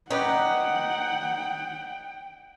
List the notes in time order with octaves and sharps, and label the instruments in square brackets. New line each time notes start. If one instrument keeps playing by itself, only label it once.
[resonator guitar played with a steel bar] C#4 B4 D5 [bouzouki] D#4 [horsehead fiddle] F#5 [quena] G5